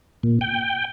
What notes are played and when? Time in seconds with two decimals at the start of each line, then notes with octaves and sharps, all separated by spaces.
0.23 A#2
0.41 G5